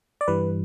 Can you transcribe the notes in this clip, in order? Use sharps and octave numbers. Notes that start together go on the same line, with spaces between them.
D5
G2 E3 G3 B4